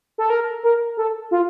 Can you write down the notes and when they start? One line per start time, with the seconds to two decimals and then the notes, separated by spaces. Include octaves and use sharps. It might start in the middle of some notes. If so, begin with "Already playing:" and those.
0.18 A4
0.30 A#4
0.63 A#4
0.97 A4
1.31 F4